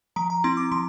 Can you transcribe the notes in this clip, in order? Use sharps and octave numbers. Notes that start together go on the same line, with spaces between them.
F3 A#5
A#5
C4 E4 C6
D6
F3 C6